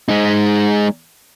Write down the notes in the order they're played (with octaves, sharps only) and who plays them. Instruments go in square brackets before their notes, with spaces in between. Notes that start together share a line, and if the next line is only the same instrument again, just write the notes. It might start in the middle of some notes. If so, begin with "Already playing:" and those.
[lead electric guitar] G#3 D#4